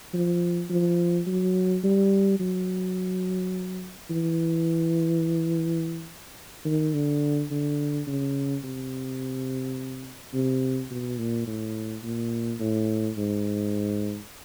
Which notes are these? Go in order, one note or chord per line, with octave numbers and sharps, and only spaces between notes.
F3
F3
F#3
G3
F#3
E3
D#3
D3
D3
C#3
C3
C3
B2
A#2
A2
A#2
A2
G#2